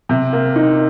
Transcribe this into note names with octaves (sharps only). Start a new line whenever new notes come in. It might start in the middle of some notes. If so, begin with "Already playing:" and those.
C3
A#3
D#4